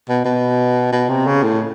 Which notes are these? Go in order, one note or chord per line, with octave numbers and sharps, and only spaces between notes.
B2
B2
B2
C3
C#3
A2